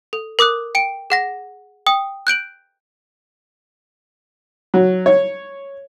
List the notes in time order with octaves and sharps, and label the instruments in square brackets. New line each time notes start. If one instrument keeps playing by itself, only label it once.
[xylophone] A4
A#4 D6 D#6 F#6
G5 D7
G#4 F#5 A#6
G5 D#6
F#6 G6 D7 F#7
[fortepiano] F#3
C#5